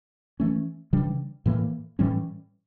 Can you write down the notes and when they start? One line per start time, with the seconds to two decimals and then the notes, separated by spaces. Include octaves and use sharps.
0.40 E3 A3 C#4
0.93 C#3 E3 G3 D4
1.46 A2 E3 A#3
1.99 A2 E3 G3 C#4